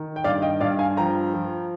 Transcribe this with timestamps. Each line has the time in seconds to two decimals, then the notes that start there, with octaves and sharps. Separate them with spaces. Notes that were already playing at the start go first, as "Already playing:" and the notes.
Already playing: D#3
0.16 G5
0.24 G2 D5 F5
0.42 D#5 G5
0.61 G2 D5 F5
0.79 F5 G#5
0.97 F3 G5 A#5
1.34 F3